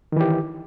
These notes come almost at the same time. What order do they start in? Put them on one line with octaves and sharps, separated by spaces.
D#3 E3 G4